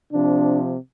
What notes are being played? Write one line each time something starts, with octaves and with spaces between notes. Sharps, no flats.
C3 F3 D4